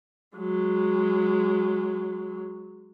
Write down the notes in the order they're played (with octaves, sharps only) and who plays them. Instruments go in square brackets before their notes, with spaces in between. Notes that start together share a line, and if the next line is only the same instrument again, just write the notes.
[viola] F#3 G#3